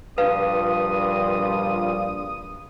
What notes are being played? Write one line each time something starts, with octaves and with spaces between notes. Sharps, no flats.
A#1 G2 G3 F4 B4 F5 D#6